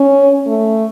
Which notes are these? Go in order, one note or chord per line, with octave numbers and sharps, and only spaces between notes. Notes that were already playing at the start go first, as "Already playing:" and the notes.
Already playing: C#4
A3